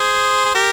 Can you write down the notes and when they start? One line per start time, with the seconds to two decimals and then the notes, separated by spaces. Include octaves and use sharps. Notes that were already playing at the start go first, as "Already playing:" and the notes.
Already playing: G#4 C5
0.45 G#4
0.54 G4 A#4